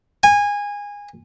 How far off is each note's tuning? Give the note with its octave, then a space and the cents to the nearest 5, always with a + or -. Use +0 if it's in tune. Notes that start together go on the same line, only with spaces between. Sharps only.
G#5 -20